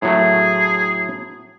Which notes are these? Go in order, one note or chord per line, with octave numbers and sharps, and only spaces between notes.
A2 F#3 A3 G#4